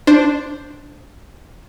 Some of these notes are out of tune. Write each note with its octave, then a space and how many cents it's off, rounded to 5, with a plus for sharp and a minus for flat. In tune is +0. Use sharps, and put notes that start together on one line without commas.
D4 +0 C5 +0